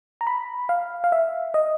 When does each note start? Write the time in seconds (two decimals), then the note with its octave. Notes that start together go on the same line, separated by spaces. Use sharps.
0.21 A#5
0.27 B5
0.69 F5
1.04 F5
1.12 E5
1.54 D#5